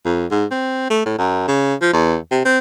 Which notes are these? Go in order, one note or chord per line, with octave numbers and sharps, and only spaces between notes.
F2
G#2
C4
A3
A2
F#2
C#3
F3
E2
C3
C4